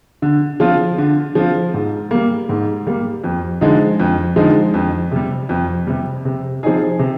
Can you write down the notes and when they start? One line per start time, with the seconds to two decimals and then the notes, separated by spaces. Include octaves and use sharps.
0.22 D3
0.60 F3 C4 F4
0.98 D3
1.35 F3 C4 F4
1.74 G#2
2.11 G3 A#3
2.49 G#2
2.87 G3 A#3
3.24 F2
3.61 D3 F3 G#3 D#4
4.00 F2
4.36 D3 F3 G#3 D#4
4.74 F2
5.12 C3 G3
5.49 F2
5.87 C3 G3
6.25 C3
6.63 F3 C4 D#4 G#4
6.99 C3